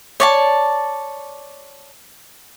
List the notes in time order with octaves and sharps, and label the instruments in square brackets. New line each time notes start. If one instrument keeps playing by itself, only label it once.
[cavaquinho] C#5 D5 A5